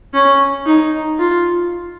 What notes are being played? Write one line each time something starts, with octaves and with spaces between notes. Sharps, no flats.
C#4
D#4
F4